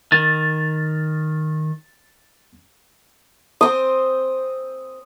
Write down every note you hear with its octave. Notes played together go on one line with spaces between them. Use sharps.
D#3 A6
C4 C5 D#6